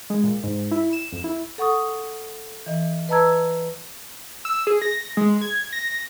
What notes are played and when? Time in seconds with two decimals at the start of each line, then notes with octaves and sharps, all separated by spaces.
0.10 G#3
0.24 A#2
0.44 G#2
0.71 E4
0.93 E7
1.12 F2
1.24 E4
1.58 A4 F#5 C#6 D#6
2.66 E3 D#5
3.09 B4 D#5 A5 A#5 E6 G#6
4.45 E6
4.67 G#4
4.82 A#6
5.17 G#3
5.41 G#6
5.73 A#6